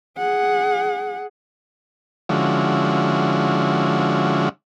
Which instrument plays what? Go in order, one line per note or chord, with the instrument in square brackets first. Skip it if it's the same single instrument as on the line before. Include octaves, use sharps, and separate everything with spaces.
[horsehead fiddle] G#4 F#5
[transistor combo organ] D3 F3 G#3 C#4 E4 F#4